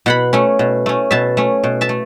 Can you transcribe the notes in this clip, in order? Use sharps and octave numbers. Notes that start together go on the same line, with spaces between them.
B2 F#5 B5
A3 C#4
B2
A3 C#4
B2 E5 A5
A3 C#4
B2
E5 A5
A3